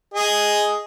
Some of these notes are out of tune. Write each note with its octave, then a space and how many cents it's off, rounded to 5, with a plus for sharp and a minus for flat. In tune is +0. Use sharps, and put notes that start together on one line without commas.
G#4 +0 D#5 +5